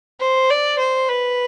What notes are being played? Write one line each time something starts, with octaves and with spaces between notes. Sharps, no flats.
C5
D5
C5
B4